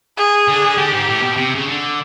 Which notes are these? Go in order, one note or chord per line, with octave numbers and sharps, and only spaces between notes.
G#4
D3
D3 G4
G#2
A2
B2
C3
C#3
D3